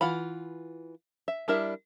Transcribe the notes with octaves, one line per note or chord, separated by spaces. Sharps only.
E3 F4 F#5 B5
E5
G3 D4 E4 A#4 E5